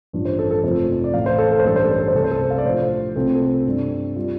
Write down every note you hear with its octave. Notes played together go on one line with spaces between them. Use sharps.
A1 G2 F3
C5
A4
A4
F1 F2 F3 A3 C5
D5
A1 A2 A3 F5
C5
A4
A4
C5
A1 G2 G3 A4
C5
A4
C5
A4
C5
C2 C3 G3 A4
C5
A4
F5
D5
A2 F3 D4 F4 C5
C2 C3 A3 C4 F4 A4
A4
G2 G3 D4
G3 F4